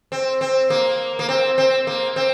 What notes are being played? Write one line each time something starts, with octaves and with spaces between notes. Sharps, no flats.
C4
C4
A#3
A#3
C4
C4
A#3
C4